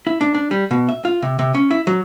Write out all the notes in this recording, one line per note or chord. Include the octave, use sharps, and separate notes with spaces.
E4
D4
D4
G3
B2
E5
F4
C3
C3
C#4
E4
F#3